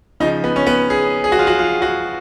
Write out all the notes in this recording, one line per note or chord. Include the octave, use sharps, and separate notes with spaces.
C#3 F3 D#4
B3
C#4
B3
G#4
G#4
F#4
F4
F#4
F4
F#4